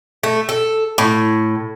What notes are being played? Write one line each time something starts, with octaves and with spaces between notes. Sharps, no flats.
A3
A4
A2